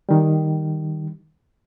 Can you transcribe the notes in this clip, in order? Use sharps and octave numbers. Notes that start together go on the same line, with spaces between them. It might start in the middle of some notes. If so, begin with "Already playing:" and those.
D#3 G3